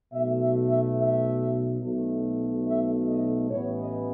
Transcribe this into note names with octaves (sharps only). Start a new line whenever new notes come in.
B1 B2 A3 E5
E5
E5
E5
B1 B2 A3
E5
D#5
A1 A2 E3 B3 C#5
D#5